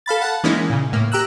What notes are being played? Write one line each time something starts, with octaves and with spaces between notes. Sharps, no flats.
A4 F5 B5 A6
F#5 A5
E3 G#3 A#3 C#4 D#4 E4
A#2 C#3
A2 A#3
G4 A#5 E6 F#6